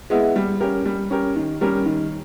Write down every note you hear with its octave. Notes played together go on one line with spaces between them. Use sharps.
G#3 B3 E4
G3
C#4 G4 A#4
G3
C#4 G4 A#4
D#3
G3 C#4 G4 A#4
D#3